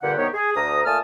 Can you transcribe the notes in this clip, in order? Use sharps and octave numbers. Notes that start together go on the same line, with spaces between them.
G2 A#2 D3 G4 F#5
C2 D#3 B3 G4 C#5
G#4
D2 A#5 D#6
A#2 A3 G#5 A5 D#6 F6